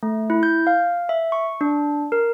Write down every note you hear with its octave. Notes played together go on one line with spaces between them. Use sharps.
A3
E4
G6
F5
E5
C#6
D4
A#4